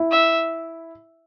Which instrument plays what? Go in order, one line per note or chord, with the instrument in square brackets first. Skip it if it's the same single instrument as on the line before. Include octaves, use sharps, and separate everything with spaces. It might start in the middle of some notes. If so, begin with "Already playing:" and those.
Already playing: [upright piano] E4
[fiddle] E5